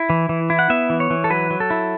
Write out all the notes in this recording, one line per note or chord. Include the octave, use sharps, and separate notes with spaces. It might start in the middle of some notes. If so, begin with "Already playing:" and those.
Already playing: E4
E3
E3
E4
F#5
B3 E5
E3
C#5
E3
A4
F#3 B4
F#3
A4
E4